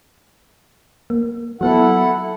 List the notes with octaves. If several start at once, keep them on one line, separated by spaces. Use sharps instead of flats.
A#3
F#3 B3 E4 A4 F#5